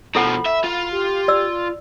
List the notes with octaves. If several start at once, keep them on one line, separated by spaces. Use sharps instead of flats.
B2 F3 E4 A4 F#5 B5
E5
F4
G4
D5 E6